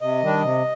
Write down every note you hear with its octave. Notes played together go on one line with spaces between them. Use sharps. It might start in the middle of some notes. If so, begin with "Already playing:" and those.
C3 D#5
D#3 G3 D4
C3